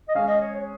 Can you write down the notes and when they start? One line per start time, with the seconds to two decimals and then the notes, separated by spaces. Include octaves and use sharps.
0.09 D#5
0.15 G#3 C#4 G#4 F5
0.28 D#5
0.41 C#5
0.55 C#5